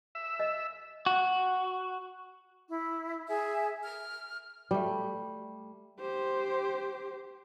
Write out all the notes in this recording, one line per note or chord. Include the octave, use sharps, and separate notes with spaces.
E5
D#5
F#4
E4
G#4 E5
F6
G3 A3
G4 C5